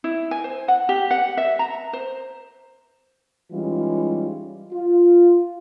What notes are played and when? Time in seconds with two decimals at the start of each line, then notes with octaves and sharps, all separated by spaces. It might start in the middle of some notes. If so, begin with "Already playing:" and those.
0.04 E4
0.31 G#5
0.44 C5
0.68 F#5
0.89 G4
1.11 F#5
1.37 E5
1.59 A#5
1.93 C5
3.52 E3 G3 G#3 C#4 D#4 F4
4.73 F4